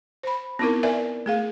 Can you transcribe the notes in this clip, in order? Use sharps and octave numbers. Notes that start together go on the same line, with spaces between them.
C5 B5
B3 C4 D#4 E4 A#4
A#4 B4 D5 E5 G#5
A3 G#4 F5